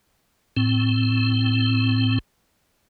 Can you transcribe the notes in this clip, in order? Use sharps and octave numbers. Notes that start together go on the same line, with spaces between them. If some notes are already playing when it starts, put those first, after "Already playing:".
A2 C4